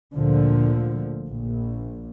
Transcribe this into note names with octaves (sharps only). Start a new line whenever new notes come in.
D2 A#2 D3 F3
A#1